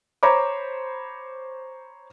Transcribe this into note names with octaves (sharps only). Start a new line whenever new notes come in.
C5 C#5 A#5 B5 D6